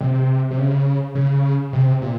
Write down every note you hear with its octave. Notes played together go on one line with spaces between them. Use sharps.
C3
C3
C#3
C#3
C3
A#2